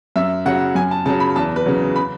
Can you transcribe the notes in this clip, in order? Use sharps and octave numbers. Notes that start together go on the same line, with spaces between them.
F#2 E5
C#3 F#3 F#5
F#2 G#5
A5
C#3 F#3 A5
B5
E2 A5
B4
C#3 F#3
B5